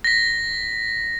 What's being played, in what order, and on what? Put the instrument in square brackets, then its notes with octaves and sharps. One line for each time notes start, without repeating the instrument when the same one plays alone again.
[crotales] A#6 B6